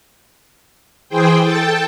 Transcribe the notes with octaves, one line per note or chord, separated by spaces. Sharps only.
E3 G#4 C5 G5
A4 G5 A5